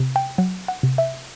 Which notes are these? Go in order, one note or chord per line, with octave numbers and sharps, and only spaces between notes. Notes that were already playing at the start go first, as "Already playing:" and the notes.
Already playing: C3
G5
F#3 F#5
F#5
C3
E5